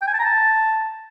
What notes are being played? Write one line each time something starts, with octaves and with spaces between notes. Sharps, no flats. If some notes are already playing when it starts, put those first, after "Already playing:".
G5
G#5
A5
A#5
A5